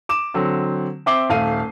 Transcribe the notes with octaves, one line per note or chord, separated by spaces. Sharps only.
D6 E7
D3 F#3 C4
C4 E5 D6 C7 G7
D#1 A3 F5 C7 D#7